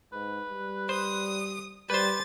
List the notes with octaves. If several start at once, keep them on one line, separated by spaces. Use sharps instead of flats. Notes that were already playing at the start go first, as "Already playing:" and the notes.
G#2 B4
G3
C5 D#6
G3 G4 B4 C5 A6